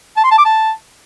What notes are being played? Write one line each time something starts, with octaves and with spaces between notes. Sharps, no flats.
A5
C6
A5
D6
A5